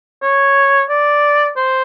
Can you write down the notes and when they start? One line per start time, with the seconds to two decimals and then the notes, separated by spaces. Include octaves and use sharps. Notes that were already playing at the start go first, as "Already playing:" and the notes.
0.22 C#5
0.90 D5
1.57 C5